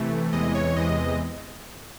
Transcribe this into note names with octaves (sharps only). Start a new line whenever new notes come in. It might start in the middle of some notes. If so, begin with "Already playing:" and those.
Already playing: C3 E3 A3
E2 C3 E3 G#3 D#5
C#5
E2 C3 E3 G#3 D#5